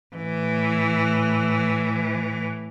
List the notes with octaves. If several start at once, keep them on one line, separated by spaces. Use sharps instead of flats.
A2 E3